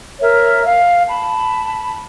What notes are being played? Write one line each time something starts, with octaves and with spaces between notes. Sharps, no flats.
A#4 C#5 E5
F5
A5 B5